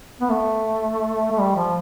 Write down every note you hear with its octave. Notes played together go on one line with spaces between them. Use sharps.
B3
A3
A3
G3
F3